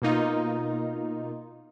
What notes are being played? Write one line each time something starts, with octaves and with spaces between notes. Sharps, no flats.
B2 A#3 D#4 F4